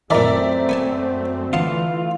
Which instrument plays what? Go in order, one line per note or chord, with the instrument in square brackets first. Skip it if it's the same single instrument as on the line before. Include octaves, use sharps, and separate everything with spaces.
[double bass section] F#2 A3 C4 [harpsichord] A#2 D#3 [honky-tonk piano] D5 E5 A#5
[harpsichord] B3 G#5 A5
[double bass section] D3 E3 A3 [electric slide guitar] F4 [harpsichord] D#5 F#5 A5